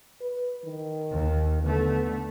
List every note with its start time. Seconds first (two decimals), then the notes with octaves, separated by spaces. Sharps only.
0.21 B4
0.65 D#3
1.11 D#2
1.63 D3 A3 B3